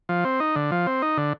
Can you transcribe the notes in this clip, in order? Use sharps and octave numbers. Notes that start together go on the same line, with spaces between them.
F3
C4
D#4
D3
F3
C4
D#4
D3